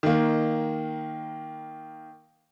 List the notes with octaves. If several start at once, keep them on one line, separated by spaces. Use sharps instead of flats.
D#3 A#3